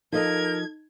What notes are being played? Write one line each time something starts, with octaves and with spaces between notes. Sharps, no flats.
F3 D#4 A4 A#4 D#5 G#6